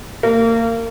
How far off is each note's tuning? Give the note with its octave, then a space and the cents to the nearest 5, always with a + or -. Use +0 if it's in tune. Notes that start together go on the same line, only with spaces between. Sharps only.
A#3 -30